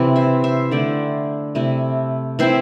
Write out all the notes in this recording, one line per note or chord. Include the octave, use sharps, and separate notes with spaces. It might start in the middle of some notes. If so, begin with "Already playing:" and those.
Already playing: C3 E3 C4 E4
C5 E5
C5 E5
D3 A3 E4 D5 G5
C3 A3 E4
E3 C4 E4 C5 E5